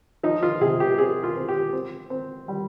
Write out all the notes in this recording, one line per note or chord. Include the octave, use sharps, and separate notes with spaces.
F3 D#4
F4
C3 G#4
G4
C4 G#4
F4
C4
G4
C4
C4
G3